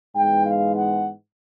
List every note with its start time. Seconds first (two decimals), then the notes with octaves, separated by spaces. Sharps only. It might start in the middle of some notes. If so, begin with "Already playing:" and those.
0.15 G#2 E3 G#3 B3 G5
0.46 F5
0.76 F#5